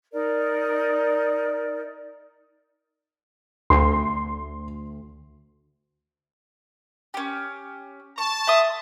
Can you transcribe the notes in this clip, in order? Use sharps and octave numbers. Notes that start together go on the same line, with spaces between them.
D#4 A#4 D5
D2 C6
C#4 G4
A5 C#6
E5 C6 D#6